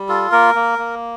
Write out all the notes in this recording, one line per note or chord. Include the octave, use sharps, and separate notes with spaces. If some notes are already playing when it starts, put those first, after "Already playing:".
Already playing: G3
F4 A4
A#3 A#4
A#3
A#3